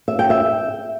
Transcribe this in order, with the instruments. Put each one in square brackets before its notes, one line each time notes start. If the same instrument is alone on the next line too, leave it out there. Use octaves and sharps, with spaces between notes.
[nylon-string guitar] E5
G5
E5